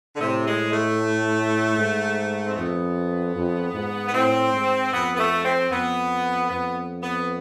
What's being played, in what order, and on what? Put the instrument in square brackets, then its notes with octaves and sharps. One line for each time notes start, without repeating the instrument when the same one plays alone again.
[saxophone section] D3
[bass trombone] A2 [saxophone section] C3
[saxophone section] G#3
A3
[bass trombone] G#2
[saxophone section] C4
[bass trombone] F2 [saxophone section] B3
[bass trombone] F2
G#2
[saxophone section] B3
[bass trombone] A2 [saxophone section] C4
[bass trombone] G#2
[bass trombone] F2 [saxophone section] B3
[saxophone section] B3
A3
C4
[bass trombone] F2 [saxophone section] B3
[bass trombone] F2 [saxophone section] B3
[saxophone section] B3